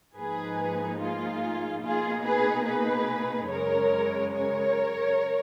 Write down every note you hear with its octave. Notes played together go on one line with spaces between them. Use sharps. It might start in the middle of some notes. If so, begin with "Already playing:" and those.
G#2 F3 A#3 D#4 G#4 B4
F4 G#4
B2 A#3 D#4 F4 G#4
G#4 B4
G#4 B4
F#2 C#3 G#3 A#4 C#5
A#4 C#5